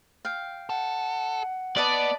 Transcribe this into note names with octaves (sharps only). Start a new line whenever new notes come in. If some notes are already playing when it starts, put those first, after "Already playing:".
F5 G5
A4 F#5
B3 B4 D5 D#5 A5